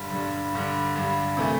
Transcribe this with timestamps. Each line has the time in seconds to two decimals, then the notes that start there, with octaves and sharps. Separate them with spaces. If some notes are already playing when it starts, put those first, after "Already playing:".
Already playing: G2 D3 G3
0.10 G2 D3 G3
0.53 G2 D3 G3
0.95 G2 D3 G3
1.37 C3 E3 A3